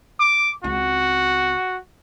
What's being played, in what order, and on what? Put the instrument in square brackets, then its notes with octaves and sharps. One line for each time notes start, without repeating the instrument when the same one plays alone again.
[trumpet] D6
[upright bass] C#2 C4 [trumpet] F#4